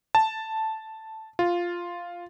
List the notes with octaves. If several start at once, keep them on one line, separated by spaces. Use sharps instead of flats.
A5
F4